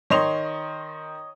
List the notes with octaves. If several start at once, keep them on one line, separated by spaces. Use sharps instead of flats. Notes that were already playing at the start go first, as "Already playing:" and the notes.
D#3 C#5 D#5 C6 F7